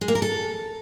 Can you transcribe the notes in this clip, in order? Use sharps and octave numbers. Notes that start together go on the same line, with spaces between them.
G#3
A#3
A#4
A4